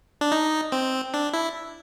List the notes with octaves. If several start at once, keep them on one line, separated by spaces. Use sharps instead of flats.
D4
D#4
C4
D4
E4